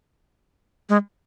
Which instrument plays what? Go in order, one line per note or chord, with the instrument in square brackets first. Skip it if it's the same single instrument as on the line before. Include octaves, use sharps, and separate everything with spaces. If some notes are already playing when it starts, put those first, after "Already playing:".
[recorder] G#3